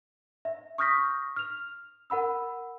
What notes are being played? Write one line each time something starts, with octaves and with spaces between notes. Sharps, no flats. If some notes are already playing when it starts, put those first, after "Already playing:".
E5
C#6 D#6 F6 G6 A#6 B6
F6 F7
A#4 F#5 B5 E6